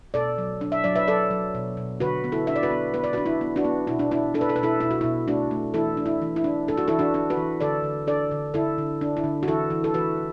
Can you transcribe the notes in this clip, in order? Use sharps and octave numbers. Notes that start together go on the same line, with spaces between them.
B2 A4 D5
F#3
D4
E5
F#3 D5
B4 E5
F#3 A4 D5
F#3
B2
B2
D3 F#4 B4
B3
E4 A4
D4 E5
D5
F#4 B4
B3
B3 B4
D5
F#4 B4
D4
E4
B3
D4 F#4
B3
B2 E4
D4
D4 E4
D4 A4
B4
A4
B2 B4
E4 A4
B2 E4
F#4
B2 E4
A3 D4 F#4
A3
E3 E4 A4
D4
E4
E3
E4
D4
D4 A4
F#4
E3 E4 A4
D4 F#4
D4
F#4 B4
E3
D3 A4 D5
D3
D4 A4 D5
D3
D3 E4 A4
D3
D4
E4
D3
F#4
E3 E4 A4
E3
A4
E3 F#4 B4